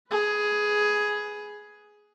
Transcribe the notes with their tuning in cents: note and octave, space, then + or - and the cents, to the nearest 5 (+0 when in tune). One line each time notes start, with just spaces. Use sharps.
G#4 +10 B4 +0